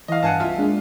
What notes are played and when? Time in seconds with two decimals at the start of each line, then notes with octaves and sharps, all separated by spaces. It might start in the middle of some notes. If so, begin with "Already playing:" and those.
0.08 E3 D#5 F5
0.23 G2 E3 F#5 G#5 A5
0.40 C2 F4 E5
0.57 G#3 A#3 D4